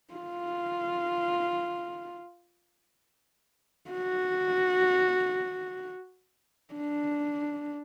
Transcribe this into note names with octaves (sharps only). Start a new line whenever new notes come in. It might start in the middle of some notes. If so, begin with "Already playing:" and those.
F4
F#4
D4